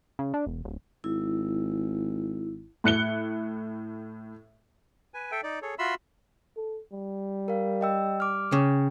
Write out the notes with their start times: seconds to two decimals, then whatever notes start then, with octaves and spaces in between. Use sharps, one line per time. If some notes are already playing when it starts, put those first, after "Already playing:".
0.19 C#3
0.34 D4
0.47 E1
0.64 D1
1.04 G#1 E4
2.84 A2 F#6 C#7 G7
5.14 B4 G#5
5.32 A4 E5 G5
5.43 D#4 D5
5.62 G#4 A4 C#5
5.79 F4 F#4 E5 B5 C6 E6
6.57 A4
6.93 G3
7.48 A#4 F5
7.81 D#5 G5 E6
8.20 D6 F6
8.52 C#3 G5